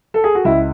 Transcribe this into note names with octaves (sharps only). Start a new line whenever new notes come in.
A4
G#4
F#4
C#2 E4